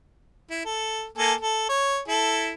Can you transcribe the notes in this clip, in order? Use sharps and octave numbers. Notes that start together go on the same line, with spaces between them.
E4
A4
A#3 A4 G#5
A4
C#5
E4 A4